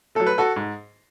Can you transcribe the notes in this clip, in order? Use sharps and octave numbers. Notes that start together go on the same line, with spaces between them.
F#3 A3 A4
B4
F#4 A4
G#2